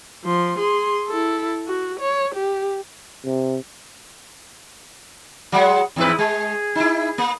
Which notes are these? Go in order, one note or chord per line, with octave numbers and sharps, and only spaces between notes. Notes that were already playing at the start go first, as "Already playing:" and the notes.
F3 C6
G#4 C6
E4 A4
F#4
C#5
G4
C3
F#3 G#3 F#5
E2 G#2 E4 B4
G#3 G#4
D#4 E4
A#3